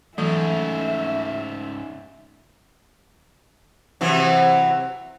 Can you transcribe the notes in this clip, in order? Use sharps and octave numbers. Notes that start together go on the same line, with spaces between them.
G#2 C#3 E3 F#3 A3 E5
C3 E3 F#3